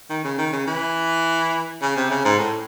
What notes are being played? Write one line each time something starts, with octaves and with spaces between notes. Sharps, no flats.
D#3
C#3
D#3
C#3
E3
C#3
C3
C#3
G#2
A2